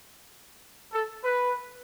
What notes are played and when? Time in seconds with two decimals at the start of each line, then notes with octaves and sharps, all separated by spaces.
0.92 A4
1.24 B4